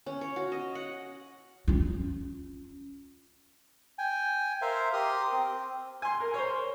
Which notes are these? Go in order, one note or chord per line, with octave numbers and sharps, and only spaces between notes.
C#4
C#5
F#4
D#5
F#5
C#4 F4
G5 G#5
A#4 C5 E5 F5
G4 A#4 C6 D#6
C4
G#5 C6
A#4
C5 C#5